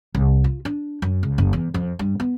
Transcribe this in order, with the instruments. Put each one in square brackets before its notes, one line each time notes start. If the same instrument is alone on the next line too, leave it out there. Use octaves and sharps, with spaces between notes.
[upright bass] C2
F4
D4
F#2
C#2
F#1
E2
F2
G2
B3